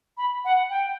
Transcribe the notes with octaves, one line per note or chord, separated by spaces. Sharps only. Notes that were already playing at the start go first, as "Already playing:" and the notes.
B5
F#5
G5